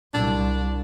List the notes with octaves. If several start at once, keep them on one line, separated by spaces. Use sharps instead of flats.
C2 D4